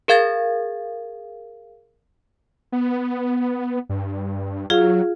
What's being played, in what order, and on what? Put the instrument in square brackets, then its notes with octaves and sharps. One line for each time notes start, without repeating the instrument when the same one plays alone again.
[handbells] G#4 A#4 F5 G#6 A6
[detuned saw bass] B3
G2
[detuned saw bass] F#3 [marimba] F4 G#4 F5